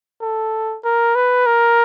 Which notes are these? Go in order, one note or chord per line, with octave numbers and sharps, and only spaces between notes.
A4
A#4
B4
A#4